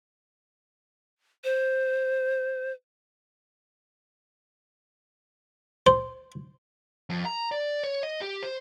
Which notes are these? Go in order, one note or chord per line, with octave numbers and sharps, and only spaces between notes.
C5
C5
F2
A#5
D5
C#5
D#5
G4
C5